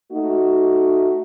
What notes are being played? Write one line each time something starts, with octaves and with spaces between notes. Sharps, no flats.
A3 D#4 F#4